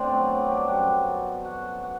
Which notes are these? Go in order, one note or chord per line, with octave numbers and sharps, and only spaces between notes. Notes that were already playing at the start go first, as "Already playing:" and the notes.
Already playing: B2 A3 C4 D4 A4 C5 D5 F#5
F#3 F#4
G3 G4
F#2 F#3 B3 F#4 F#5
F#4 F#5
F#4 F#5